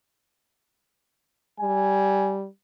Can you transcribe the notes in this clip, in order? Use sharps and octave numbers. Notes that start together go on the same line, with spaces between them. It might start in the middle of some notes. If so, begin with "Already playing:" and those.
G3 G#5